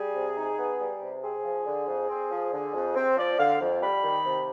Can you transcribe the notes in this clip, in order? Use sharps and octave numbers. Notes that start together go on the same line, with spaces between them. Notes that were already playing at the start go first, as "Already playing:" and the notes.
Already playing: G3 G#4
C3
D#4
B3
G3
C3
C4 G#4
F3
D3
F2
C4
F3
D3
F2
C4
F3 D5
D3 F5
F2
G3 B5
D#3
C3